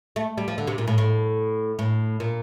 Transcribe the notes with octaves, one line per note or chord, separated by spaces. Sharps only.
A3
G3
F3
D3
C3
A#2
A2
A2
A2
A#2